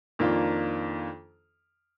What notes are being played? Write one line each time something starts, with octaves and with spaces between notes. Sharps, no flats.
F2 D#3 A#3 D4 F4